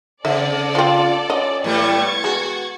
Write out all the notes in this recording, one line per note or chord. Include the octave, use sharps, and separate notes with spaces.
C#3 C4 A4 D5 E5
F3 C4 F4
C#4 D#5
A2 G3 A3 B3 C#6 G#6 A6
G#3 F#4